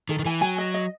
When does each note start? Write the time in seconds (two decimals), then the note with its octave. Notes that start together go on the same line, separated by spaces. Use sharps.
0.09 D#3 A4
0.19 D#3
0.25 E3 G#5
0.41 F#3 G#5
0.58 D#5
0.74 D#5